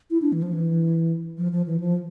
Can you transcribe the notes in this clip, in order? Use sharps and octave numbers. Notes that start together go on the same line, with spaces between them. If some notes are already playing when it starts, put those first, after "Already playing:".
E4
D4
E3
F3
E3
F3
F3
E3
F3